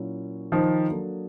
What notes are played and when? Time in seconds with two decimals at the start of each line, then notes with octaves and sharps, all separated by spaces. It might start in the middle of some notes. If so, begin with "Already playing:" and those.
Already playing: A#2 F#3 A#3 C#4 E4
0.52 D#3 F3
0.88 F#3 A#3 D4 F#4 A4